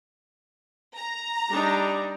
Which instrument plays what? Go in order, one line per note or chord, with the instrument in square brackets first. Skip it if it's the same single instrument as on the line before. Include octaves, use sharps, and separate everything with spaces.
[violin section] A#5
[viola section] G3 D4 D#4